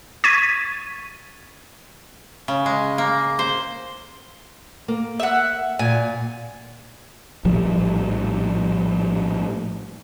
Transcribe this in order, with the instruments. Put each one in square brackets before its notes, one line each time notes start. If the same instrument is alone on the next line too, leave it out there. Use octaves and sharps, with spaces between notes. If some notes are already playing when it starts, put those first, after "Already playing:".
[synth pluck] C#6 G#6 A6 B6 D#7
[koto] C#3
G#3
A#3
C5
[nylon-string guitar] A#3
[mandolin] E5 F#5
[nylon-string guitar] A#2 [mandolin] G#5
[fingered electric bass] A#1 A2 F3 G3